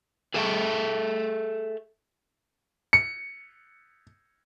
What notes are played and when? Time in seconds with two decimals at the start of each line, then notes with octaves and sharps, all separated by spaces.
0.34 G#4 A4 E5 F#5 G5 A5
2.93 C#7